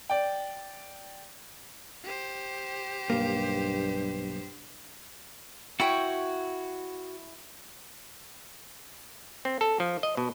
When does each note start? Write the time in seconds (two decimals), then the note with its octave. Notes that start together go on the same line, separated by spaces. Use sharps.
0.10 D5 G5
2.04 G4 C5
3.10 B1 G2 A#3
5.80 E4 F#4 C#5 G5
9.45 C4
9.61 A4
9.80 F3
10.03 D#5
10.17 B2